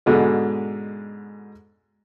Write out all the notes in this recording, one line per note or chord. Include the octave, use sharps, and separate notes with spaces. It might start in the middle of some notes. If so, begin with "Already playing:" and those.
G#2 B2 D3 G#3